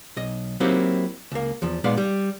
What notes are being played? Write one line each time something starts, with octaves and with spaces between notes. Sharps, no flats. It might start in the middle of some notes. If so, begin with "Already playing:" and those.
B1 D#5
F#3 A#3 C4 D#4 E4 G4
C#2 A#3
E2 F3
A#2 G#3 B3 D#4 D5 F5
G3